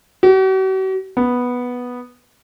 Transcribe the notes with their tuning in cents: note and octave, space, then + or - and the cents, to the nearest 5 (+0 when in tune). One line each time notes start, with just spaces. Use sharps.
F#4 +45
B3 -5